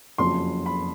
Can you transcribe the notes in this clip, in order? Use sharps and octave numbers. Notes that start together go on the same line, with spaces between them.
F#1 F2 C#3 F#3 C6
B5